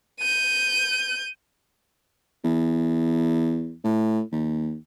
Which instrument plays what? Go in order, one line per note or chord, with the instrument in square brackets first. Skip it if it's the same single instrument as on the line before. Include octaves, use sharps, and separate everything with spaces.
[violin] G6 D#7
[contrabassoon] E2
A2
D#2